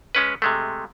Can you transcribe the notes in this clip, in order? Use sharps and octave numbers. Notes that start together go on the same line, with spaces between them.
G#3 C#4 B4
C3 G#3 A3